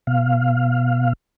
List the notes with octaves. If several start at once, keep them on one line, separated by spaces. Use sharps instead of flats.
B2 F5